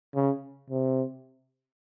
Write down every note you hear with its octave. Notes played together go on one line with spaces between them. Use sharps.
C#3
C3